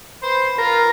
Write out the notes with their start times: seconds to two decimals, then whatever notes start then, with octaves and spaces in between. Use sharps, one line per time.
0.23 B4 C5
0.58 F4 A#4